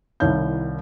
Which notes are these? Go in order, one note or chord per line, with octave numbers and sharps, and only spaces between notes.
C2 D#3 E4 C#5 F5 G6